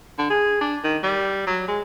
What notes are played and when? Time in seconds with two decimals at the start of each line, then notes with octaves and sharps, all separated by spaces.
0.18 D3
0.30 G#4
0.61 D4
0.84 D#3
1.03 G3
1.47 F#3
1.68 G#3